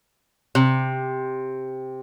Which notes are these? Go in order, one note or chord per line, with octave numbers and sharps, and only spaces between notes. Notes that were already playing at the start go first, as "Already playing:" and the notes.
C3